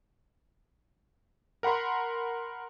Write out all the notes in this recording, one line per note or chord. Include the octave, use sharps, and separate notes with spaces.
A#4 F#5 B5 C6